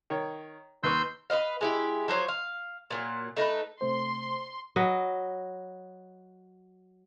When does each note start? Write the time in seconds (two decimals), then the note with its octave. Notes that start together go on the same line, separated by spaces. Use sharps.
0.10 D#3 C#5
0.83 D#2 B4 C6 C#6 E6 G6
1.30 B4 C5 D#5 F5
1.61 G#3 E4 G4
2.08 F3 F#3 C5 C#5
2.28 F5
2.91 A#2 E3 F#3
3.37 A3 D#4 G#4 B4
3.81 C3 A3 C5 C6
4.76 F#3 B4 D#5